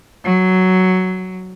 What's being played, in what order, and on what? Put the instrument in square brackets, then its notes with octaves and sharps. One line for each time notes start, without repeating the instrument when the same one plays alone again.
[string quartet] F#3